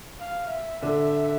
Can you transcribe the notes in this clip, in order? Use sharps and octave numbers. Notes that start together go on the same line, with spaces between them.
F5
E5
D3